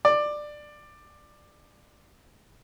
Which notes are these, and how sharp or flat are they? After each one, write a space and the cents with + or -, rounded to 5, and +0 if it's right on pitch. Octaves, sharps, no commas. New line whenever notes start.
D5 +15